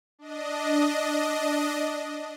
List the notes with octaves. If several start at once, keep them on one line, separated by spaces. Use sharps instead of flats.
D4 D#5